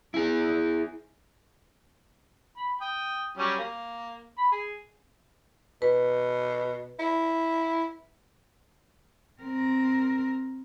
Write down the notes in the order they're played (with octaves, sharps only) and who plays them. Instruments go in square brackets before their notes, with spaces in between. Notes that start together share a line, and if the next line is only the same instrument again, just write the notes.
[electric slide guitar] E4 G#4
[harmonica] B5
G5 D#6
F#3 G3 C#4
A#3
B5
G#4
[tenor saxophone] B2 [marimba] B4
[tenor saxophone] E4
[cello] C4 A#4